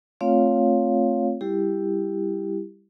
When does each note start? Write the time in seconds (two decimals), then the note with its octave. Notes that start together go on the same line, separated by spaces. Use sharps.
0.21 A3 C4 F4 C#5 F5
1.41 G3 E4 G4